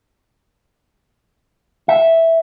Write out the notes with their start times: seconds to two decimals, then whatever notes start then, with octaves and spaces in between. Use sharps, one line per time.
1.88 E5